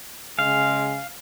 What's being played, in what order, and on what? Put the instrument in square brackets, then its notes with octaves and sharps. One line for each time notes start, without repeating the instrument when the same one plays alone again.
[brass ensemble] C#3 G#3 G#5 [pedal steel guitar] F5